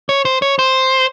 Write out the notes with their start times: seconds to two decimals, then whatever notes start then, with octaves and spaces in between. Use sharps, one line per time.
0.09 C#5
0.25 C5
0.42 C#5
0.59 C5